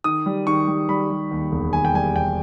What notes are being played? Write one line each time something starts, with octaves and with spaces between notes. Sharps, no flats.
D#3 D#6
G3
D#3 C#6
G3
G3 B5
G3
D#2
E1
D#2 G#5
G5
G3 G#5
E1 G5